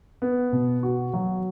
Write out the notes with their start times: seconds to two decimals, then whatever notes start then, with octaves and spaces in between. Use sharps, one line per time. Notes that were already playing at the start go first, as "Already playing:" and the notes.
0.22 B3
0.52 B2
0.83 F#4
1.13 F#3